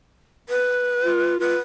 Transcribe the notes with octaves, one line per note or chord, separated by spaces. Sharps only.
B4
F4
F4 B4